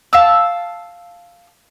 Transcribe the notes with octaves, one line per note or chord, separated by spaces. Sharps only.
F5 A5 E6